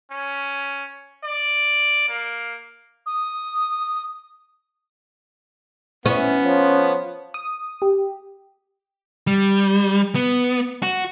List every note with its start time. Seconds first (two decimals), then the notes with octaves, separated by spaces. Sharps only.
0.11 C#4
1.24 D5
2.09 A#3
3.06 D#6
6.06 B3 C#4 E4
6.42 F3 C#5
7.34 D#6
7.82 G4
9.27 G3
10.15 B3
10.83 F#4